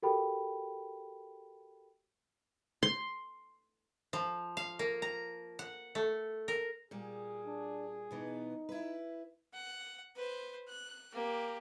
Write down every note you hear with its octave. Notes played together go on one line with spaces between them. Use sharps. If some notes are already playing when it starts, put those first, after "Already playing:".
F#4 G4 A4 A#4 G5 B5
C6
F3
F5
A#3
A#5
F#5
A3
A#4
A#2 G3 G#4
D4
B2 E3 B3 D#4
E4 B4
F#5
B4 C5
F#6
A#3 G4